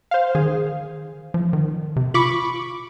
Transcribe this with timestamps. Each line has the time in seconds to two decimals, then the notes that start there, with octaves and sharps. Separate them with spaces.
0.11 C5 F5
0.35 D#3 G#4
1.34 F3
1.53 D#3
1.96 C3
2.14 F4 B5 C#6 D6